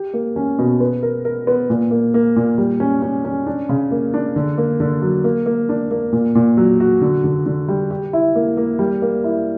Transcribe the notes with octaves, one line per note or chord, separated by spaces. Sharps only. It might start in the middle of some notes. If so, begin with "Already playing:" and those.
Already playing: G4
A#3
C#4
B2
B3
A#4
A#4
B3
A#2
A#3
A#3
A#2
G3
C#4
C#4
C#4
D4
C#3
A#3
D4
D3
A#3
D3
F#3
A#3
A#3
D4
A#3
A#2
A#2
F#3
F#4
D3
D3
D3
G3
G4
E4
A#3
A#3
G3
A#3
E4